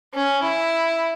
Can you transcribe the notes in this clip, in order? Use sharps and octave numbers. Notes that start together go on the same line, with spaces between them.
C#4
E4